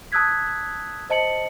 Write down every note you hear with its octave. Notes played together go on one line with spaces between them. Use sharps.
A5 D#6 E6 F#6 G#6 B6
C5 D#5 A5 C#7 F#7